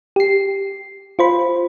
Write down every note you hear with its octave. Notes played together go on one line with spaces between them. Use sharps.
G4 C7
F4 C5 B5